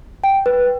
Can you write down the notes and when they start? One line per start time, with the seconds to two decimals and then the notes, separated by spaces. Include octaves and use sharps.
0.24 G5
0.46 B4